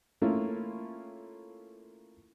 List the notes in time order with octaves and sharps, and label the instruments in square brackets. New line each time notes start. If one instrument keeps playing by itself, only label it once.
[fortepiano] A3 A#3 C#4 E4 F4